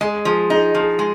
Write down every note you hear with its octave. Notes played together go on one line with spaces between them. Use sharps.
G#3 G#4
F3 G#4
D#4 G#4
F3
G#4
G#3